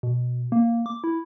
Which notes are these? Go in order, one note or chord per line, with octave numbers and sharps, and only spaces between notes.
B2
A#3
D6
E4